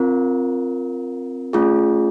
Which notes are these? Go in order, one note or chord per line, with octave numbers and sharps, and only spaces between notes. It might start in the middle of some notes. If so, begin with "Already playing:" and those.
Already playing: C4 F4 A#4
A3 C#4 F4 G#4